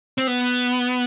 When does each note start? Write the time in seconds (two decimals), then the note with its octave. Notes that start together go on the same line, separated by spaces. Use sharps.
0.18 C4
0.27 B3